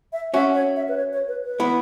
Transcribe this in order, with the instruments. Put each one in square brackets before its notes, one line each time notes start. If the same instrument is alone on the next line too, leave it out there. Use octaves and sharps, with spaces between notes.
[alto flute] E5
[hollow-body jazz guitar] C#4 F#4 [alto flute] E5
[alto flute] C#5
E5
B4
C#5
C#5
B4
B4
[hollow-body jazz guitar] B3 E4